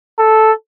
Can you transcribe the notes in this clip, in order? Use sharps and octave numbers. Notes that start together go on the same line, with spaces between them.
A4